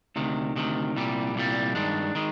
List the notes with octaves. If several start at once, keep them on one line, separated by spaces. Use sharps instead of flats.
D2 C3 D#3
D2 C3 D#3
C2 A#2 G3
C2 A#2 G3
G2 D#3 G#3 D4
D#3 G#3